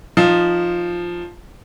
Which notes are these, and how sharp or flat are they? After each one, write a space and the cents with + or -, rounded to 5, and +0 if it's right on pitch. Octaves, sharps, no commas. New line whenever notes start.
F3 +0 D#4 -15